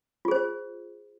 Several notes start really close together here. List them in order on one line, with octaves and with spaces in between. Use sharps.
F4 G#4 C5